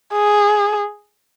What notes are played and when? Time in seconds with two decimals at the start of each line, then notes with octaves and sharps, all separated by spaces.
0.13 G#4